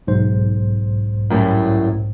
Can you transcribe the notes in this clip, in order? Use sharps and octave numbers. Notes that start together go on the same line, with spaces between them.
B1 G#2 C5
F#2 A2 G3